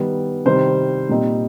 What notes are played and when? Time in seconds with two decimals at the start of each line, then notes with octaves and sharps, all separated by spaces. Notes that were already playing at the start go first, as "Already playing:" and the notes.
Already playing: D#3 G3 B3
0.45 C3 D#3 G3 C5
1.09 A#2 G3 C4 D#4